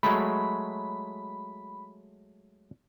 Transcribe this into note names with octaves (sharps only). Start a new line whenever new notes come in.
F#3 G#3 A3 B5